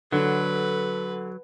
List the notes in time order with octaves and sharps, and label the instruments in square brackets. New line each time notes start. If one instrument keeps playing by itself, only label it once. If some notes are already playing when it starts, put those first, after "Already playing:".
[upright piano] D3 [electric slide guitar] F#3 [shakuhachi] A4 [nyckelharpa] B4